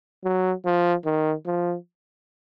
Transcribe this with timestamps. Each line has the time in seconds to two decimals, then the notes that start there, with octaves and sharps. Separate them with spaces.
0.24 F#3
0.65 F3
1.05 D#3
1.46 F3